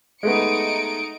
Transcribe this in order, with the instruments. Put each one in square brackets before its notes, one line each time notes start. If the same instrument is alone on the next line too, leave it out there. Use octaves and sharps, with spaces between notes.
[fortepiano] G#3 A3 B3 [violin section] D#4 C#7 D7